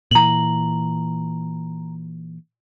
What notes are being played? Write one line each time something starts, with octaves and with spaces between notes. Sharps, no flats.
A#2 E3 A#5 F#7